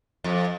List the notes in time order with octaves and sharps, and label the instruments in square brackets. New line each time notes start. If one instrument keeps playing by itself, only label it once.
[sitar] F2